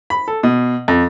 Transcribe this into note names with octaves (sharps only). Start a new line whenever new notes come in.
B5
A4
B2
F2